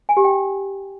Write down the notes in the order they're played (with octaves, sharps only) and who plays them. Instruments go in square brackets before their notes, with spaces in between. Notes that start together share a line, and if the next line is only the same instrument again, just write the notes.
[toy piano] G#5
G4
G5